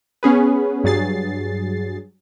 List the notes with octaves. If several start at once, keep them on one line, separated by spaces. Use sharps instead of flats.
B3 C#4 G#4 B4
G2 F#3 G#4 A6 C7